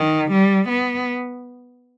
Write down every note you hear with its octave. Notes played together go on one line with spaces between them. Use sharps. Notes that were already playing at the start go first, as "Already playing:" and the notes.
Already playing: D#3
G3
B3